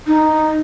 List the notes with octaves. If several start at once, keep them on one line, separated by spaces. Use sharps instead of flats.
D#4